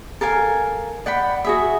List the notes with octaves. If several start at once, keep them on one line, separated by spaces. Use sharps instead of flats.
A4 A#4 F5 G#5
D5 F#5 G5 B5
F#4 G#4 E5